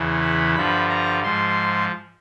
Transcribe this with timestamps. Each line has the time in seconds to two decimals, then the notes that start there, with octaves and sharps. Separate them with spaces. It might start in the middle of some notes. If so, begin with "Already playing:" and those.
Already playing: E2 C#3 E3
0.21 B5
0.55 G2 D3 F3 B5
0.89 A#5
1.23 G#2 F3 C6